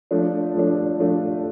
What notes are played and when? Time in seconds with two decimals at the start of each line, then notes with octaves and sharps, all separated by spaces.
0.11 F3 A3 D4
0.55 F3 A3 D4
0.99 F3 A3 D4